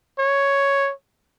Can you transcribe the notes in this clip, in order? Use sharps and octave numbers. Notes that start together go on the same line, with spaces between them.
C#5